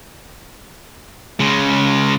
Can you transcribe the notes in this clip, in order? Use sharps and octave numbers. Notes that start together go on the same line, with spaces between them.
C#3 G#3